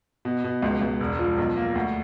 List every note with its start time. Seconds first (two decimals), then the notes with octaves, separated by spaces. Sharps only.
0.25 B2
0.44 B2
0.62 C#2
0.81 C#2
1.00 E1
1.19 F3
1.38 B1
1.57 A#3
1.75 D2